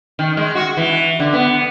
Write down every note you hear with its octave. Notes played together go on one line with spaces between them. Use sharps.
D#3
G#3
F#4
E3
D3
B3